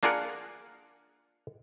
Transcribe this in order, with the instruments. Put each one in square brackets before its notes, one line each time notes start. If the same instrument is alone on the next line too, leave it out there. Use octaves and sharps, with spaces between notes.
[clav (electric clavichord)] A#3 D4 F4 G#4 A#4 F#5